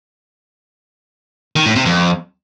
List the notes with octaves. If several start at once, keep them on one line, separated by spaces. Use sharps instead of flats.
D#3
A2
C3
F2